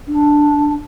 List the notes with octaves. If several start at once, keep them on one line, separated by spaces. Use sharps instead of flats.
D4